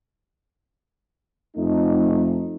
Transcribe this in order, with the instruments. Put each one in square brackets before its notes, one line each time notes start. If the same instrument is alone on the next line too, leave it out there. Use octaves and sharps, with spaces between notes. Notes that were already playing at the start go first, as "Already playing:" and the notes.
[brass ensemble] F2 A3 D#4